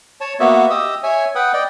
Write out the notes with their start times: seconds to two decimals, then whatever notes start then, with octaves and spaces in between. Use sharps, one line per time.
0.21 C#5 A5
0.40 A#3 B3 F#4 E5
0.70 G4 D#5 D#6 E6
1.03 C#5 E5 G#5
1.35 B4 F#5 G5 D#6
1.53 D5 D#5 G5